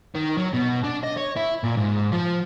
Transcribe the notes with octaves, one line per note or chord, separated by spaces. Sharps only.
D#3
F#3
B2
D4
D#5
C#5
E4
A#2
G#2
F3